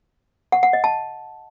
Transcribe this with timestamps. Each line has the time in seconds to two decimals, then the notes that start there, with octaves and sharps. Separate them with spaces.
0.52 F#5
0.63 F#5
0.73 D#5
0.84 A5